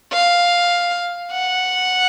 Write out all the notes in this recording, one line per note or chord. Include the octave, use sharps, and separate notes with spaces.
F5
F#5